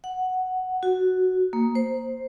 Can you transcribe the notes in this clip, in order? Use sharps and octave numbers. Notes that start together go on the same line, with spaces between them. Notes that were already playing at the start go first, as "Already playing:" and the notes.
F#5
F#4
A#3
C5